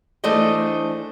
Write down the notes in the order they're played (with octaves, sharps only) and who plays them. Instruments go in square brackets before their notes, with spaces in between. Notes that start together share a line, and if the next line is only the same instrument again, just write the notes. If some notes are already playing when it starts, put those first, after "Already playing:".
[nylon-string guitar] E3 A3 D4 C5 D5 D#5